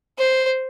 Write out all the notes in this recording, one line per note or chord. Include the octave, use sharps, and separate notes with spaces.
C5